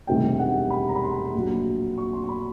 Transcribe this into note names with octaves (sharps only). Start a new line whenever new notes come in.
E1 D2 C3 D#3 G3 G5
F#5
B5
A#5
B5
C6
A#1 A#2 F#3
C#6
C6
C6
B5